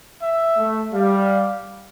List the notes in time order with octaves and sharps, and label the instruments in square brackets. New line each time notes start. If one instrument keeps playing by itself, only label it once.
[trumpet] E5
[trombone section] A3
[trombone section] G3 [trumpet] F5